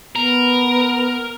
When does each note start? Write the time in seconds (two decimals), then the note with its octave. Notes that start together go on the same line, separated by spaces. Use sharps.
0.16 B3 A#4